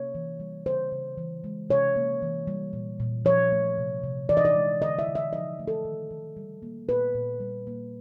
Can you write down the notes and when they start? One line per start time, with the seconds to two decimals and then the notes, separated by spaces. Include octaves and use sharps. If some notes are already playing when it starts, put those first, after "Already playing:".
Already playing: C3 A#3 C#5
0.15 E3
0.40 G3
0.66 C#3 C5
0.92 C#3
1.18 E3
1.44 G#3
1.70 C3 C#5
1.96 A#3
2.22 E3
2.47 G3
2.73 A#2
3.00 A#2
3.25 F3 C#5
3.52 A3
3.78 C3
4.03 C3
4.29 E3 D5
4.37 D#5
4.45 D5
4.55 G#3
4.81 D3 D#5
4.99 E5
5.08 D3
5.15 E5
5.33 F3 D#5
5.59 A3
5.68 A4
5.85 D#3
6.11 D#3
6.37 G3
6.62 A#3
6.89 A#2 B4
7.15 A#2
7.40 G3
7.67 A#3